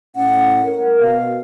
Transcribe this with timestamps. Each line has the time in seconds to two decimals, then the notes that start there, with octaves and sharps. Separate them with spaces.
0.16 A2 C#4 F#5
0.63 A#4
1.00 B2 F5